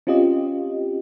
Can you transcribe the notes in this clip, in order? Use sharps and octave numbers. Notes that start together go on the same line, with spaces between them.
C4 C#4 F4 G4 D#5